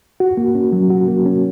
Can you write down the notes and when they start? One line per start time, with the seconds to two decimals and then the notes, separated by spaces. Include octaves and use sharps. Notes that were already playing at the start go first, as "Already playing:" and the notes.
0.20 F#4
0.37 A#3
0.55 C#4
0.72 F#3
0.90 F#4
1.08 A#3
1.26 C#4